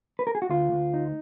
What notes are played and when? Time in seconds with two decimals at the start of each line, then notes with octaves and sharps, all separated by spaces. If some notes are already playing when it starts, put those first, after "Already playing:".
0.19 B4
0.27 A#4
0.35 G#4
0.42 F#4
0.49 D2 F4
0.72 D2
0.94 D#4